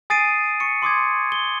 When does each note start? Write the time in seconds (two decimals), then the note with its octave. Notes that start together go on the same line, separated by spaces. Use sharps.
0.10 G#5 D#6 A6 C7 D7 D#7
0.60 C#6 C#7
0.82 C6 D6 D#6 G#6
1.32 G7